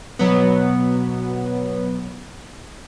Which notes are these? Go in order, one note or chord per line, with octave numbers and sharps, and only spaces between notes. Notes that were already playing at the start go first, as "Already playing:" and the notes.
B2 F#3 B3